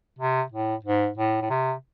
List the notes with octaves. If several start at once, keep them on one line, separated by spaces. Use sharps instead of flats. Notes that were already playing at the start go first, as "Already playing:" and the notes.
C3
A2
G#2
A2
A2
C3